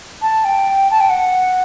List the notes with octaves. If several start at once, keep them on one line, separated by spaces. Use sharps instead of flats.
A5
G5
A5
G5
F#5